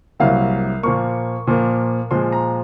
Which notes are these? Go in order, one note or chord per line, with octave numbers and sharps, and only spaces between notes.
C2 C3 F#3 A#3 F5
A#2 F3 A#3 C#6
A#2 F3 A#3
A#2 F3 G#3 C6
A#5